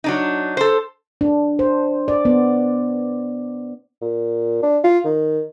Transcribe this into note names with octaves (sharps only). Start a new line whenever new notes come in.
F#3 D4 D#4
A4 C5
D4
C5
D5
B3
A#2
D4
F4
D#3